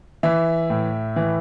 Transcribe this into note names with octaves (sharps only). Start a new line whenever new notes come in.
E3 E5
A2
E3